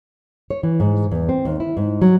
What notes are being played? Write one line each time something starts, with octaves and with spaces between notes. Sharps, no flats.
C#5
E3
G#2
E2
C4
D#2
E4
G#2
F#3